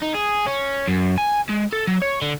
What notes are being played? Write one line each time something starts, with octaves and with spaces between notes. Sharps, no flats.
D#4
G#4
C#4
F#2
G#5
G#3
A4
F#3
C#5
D3